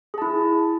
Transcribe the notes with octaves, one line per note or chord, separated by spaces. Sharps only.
E4 G#4 A5